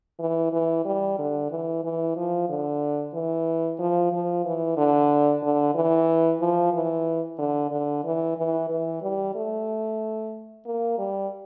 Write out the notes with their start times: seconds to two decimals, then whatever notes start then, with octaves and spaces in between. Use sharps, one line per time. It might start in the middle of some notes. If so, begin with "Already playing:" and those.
0.19 E3
0.53 E3
0.85 G3
1.18 D3
1.51 E3
1.83 E3
2.16 F3
2.49 D3
3.14 E3
3.79 F3
4.12 F3
4.45 E3
4.77 D3
5.43 D3
5.75 E3
6.41 F3
6.73 E3
7.38 D3
7.71 D3
8.04 E3
8.37 E3
8.70 E3
9.02 G3
9.35 A3
10.66 A#3
10.98 G3